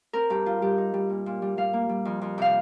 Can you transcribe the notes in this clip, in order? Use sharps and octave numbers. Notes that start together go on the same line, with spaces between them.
C4 A#4
G2 G4
G3 F4
G3 G4
D#4
G3
A#2
A#2
G3
G3 F5
A#3
G3
F2
F2
C3 F5